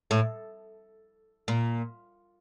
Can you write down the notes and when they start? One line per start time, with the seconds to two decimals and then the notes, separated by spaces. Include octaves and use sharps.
0.11 A2
1.48 A#2